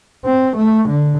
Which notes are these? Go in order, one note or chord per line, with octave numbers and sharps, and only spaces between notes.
C4
A3
D3